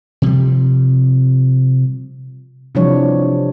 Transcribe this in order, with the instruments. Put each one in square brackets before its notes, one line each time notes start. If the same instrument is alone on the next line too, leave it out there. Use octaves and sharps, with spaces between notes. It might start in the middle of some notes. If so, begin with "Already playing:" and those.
[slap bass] C3 F3 G3
[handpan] C3 E3 F3 G3 D4 C#5